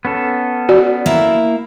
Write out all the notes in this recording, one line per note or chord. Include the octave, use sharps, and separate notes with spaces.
B3 C#4 A4
F#4 D5
A#3 E4 E5